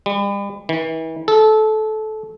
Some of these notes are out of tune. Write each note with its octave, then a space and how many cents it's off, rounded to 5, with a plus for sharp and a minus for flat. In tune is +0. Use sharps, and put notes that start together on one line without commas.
G3 +40
E3 -35
A4 -20